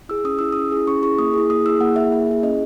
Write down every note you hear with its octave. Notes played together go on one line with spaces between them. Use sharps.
E4 G#4 E6
C#4 D#6
E4 G#4 E6
C#4 D#6
E4 G#4
C#4 C#6
E4 G#4 C#6
A#3 D#6
E4 G#4
A#3 D#6
E4 G#4 E6
A#3 F#5
E4 G#4 E5
A#3
E4 G#4
C#4 D#5